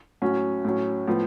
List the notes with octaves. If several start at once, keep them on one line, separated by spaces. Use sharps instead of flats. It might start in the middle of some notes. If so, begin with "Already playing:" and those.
A2 F#3 C#4 F#4
A2 F#3 C#4
A2 F3 B3